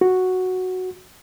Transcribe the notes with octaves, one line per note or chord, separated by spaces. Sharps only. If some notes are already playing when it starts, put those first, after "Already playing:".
F#4